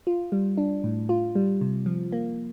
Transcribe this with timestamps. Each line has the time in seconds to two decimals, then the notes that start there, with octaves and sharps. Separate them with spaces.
0.07 F4
0.32 G3
0.58 D4
0.84 A2
1.09 F4
1.35 G3
1.61 C3
1.86 F3
2.12 A#3